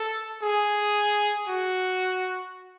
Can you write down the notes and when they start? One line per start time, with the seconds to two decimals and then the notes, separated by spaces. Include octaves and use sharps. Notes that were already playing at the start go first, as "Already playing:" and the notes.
Already playing: A4
0.42 G#4
1.48 F#4